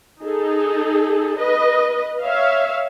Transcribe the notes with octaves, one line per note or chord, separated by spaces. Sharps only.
D#4 G#4 A4
B4 D#5
C#5 E5 F5